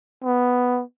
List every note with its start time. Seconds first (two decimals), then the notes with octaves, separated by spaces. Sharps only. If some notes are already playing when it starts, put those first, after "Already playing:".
0.24 B3